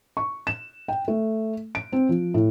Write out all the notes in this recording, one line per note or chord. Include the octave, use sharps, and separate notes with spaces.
C#6
E7
G5
A3
D7
C4
F3
A2